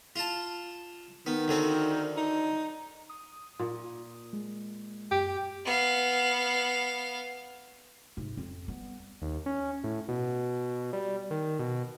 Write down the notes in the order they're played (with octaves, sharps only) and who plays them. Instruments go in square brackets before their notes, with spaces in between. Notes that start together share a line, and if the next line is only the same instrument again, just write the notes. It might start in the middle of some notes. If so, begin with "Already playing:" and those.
[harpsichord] F4 A5
[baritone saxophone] D#3 [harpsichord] B3
[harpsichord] D2 D3 C4
[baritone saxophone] D#4
[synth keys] D#6
[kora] A#2
[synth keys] G#3
[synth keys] F#2 [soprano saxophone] G4
[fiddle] B3 F5
[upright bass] G#2 C3
F2
G3 B3
[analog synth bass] D#2
C#4
A2
B2
G3
D#3
B2